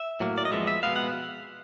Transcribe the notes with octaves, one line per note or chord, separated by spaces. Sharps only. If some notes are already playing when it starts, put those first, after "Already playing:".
Already playing: E5
A2 F#3 A#3
D5
D#5
F2 C3 F3 G#3 B3 E5
E5
B2 G#3 B3 F5
F#5